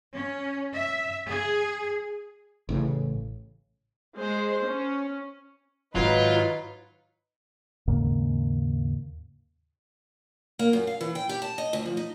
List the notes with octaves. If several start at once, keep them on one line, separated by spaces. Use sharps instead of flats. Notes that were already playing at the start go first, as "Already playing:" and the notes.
C#4
E5
G#4
A1 A2 C#3
G#3 C5
C#4
G#2 D#3 F#3 D#4 F4 B4
D#2 G#2 C#3 A#3
A#3
F#2
F5
E3
G5
G4
A5
D#5
D2
F3
D#4